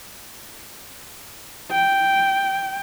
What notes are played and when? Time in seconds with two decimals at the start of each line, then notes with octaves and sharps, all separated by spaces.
1.71 G5